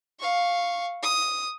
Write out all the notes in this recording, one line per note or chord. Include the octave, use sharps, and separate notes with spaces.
F5 C#6
D#6